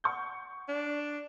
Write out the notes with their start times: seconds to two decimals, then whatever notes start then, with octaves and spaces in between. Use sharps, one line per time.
0.04 F#5 C#6 G6
0.69 D4